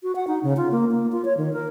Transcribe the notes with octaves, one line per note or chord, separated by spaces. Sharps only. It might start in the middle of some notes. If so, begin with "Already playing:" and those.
F#4
F#5
D#4
C#3
F4
A#3
A#3
F4
C#5
D#3
A#4